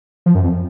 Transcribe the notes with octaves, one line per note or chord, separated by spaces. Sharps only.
F3
F#2
F2